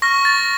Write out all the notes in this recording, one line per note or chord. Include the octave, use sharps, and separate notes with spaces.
C#6 F6 A#6
A6